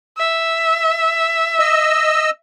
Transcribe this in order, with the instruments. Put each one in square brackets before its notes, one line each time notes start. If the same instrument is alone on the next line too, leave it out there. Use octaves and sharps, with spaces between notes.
[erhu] E5
[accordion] D#5 E6